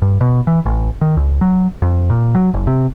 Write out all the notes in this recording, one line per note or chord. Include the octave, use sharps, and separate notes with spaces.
G2
B2
E3
A1
D#3
C#2
F#3
F2
A#2
F#3
F#1
C3